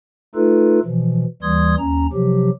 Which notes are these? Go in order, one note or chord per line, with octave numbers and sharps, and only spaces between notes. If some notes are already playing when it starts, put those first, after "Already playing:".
A3 D#4 F4 A4 B4
B2 E3 F3
D#2 E3 G3 C6 D#6 G#6
D#2 C#4 A#5
C3 F3 F#3 G4